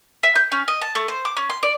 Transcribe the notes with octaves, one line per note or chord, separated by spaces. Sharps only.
E5
G6
C#4
D#5
A5
A3
C5
D6
C#4
C6
D5